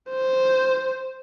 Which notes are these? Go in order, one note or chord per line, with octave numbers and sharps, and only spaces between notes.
C5